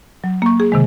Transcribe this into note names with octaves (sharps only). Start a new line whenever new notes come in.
F#3
A#3 C#6
G#4
C3 D#3 G#3